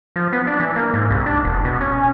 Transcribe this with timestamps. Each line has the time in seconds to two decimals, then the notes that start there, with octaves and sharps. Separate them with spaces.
0.16 F3
0.33 B3
0.47 D4
0.60 E3
0.76 A#3
0.94 G#2
1.11 C2
1.26 D4
1.45 E1
1.65 B2
1.81 C#4